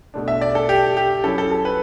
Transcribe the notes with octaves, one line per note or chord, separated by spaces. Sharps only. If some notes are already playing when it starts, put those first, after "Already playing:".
B2 A3 D4
E5
D5
A4
G4
G4
F#3 C#4 E4 A4
A4
A4
B4